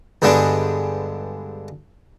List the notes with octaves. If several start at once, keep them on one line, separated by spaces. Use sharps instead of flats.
G2 D3 G#3 B3 D4